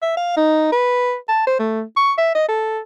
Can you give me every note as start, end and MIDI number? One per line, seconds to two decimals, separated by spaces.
0.02 0.13 76
0.17 0.32 77
0.37 0.71 63
0.72 1.15 71
1.29 1.44 81
1.47 1.57 72
1.59 1.82 57
1.97 2.13 85
2.18 2.31 76
2.35 2.48 75
2.49 2.80 69